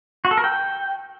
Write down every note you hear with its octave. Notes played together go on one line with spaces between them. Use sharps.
F#4
A4
A#4
G5